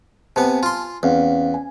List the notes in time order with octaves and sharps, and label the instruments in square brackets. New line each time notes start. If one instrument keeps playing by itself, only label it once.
[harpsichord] C3 B3 [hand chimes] G#5 A5
[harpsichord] F4 C6
[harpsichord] E2 [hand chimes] C4 C#4 F5
[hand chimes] G#5